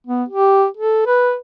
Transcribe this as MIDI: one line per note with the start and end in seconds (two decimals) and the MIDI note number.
0.07 0.24 59
0.29 0.66 67
0.77 1.03 69
1.07 1.36 71